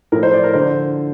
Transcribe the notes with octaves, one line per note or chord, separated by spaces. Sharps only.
A2 F3 A#4
C5
D5
A#4
D3 F3 C5